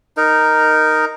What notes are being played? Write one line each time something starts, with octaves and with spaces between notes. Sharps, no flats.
D#4 A#4